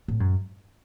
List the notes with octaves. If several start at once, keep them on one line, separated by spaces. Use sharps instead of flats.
A2
F#2